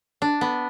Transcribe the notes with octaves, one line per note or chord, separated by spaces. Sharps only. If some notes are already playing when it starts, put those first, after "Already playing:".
D4
B3